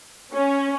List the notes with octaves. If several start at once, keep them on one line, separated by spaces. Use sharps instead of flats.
C#4